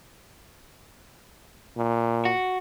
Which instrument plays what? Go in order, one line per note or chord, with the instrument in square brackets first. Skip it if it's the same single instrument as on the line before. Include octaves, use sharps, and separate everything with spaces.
[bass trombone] A#2
[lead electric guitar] F#4